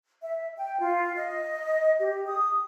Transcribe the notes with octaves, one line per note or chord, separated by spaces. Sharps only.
E5
G5
F4
D#5
G4
D#6